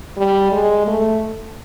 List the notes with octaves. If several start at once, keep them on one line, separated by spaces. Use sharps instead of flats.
G3
G#3
A3